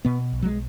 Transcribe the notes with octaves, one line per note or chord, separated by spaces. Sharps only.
B2 B3
B1
F#3
G#3